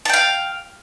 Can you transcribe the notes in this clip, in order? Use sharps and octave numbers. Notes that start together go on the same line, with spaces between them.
F5 G5 A5